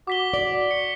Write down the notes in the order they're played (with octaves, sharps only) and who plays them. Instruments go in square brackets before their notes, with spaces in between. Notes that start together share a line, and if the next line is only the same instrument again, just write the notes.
[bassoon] F#4 [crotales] D6 B6 G7
[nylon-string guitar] D5
[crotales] C#7